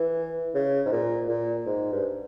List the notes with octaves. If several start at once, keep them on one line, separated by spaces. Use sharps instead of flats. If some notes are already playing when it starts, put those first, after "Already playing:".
Already playing: E3
C#3
G#2
A#2
A#2
G#2
G2